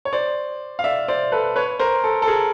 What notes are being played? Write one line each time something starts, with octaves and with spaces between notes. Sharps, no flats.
C#5
C5 D5
F5
D5 E5
C5 D5
A4 B4
B4 C#5
A#4 C5
A4
A4
G#4 A#4